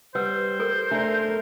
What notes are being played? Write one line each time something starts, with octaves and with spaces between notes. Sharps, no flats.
G3 B4 C5 F#5 E6
A4 A#4 C#6
A3 D4 A#4 D5